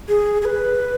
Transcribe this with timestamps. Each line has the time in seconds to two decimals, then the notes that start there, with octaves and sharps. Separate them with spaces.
0.08 G#4
0.42 G#4
0.46 B4